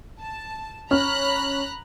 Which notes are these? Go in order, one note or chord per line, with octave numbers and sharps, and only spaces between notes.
A5
C#4 A#5 B5 F6 F#6